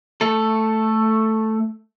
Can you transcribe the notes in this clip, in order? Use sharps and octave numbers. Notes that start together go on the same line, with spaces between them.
A3 A4